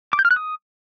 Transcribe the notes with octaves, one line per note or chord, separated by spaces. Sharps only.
D6
G6
F6
F#6
D#6